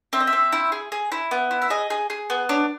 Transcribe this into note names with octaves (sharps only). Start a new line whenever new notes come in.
C4 E5
D#5
E5
C4
E4
G#4
G#4
E4
B3
E4
E5
G#4 D#5
G#4
G#4
B3
D4 C#5